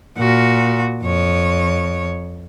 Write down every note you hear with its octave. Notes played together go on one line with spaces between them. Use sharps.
A#2 F#4
F2 C#5